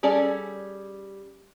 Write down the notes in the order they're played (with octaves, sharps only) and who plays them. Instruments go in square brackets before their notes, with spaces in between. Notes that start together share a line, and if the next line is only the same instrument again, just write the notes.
[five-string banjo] G3 C#4 G#4 A4 D5